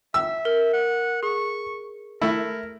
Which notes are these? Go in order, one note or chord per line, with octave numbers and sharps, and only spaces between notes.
E5 E6
A#4
F#5
G#4 C#6
A3 E4 A#4